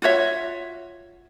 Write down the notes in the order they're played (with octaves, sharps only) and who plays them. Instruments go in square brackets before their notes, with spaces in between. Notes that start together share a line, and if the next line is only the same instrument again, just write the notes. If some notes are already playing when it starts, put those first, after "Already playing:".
[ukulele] F4 F#4 C#5 E5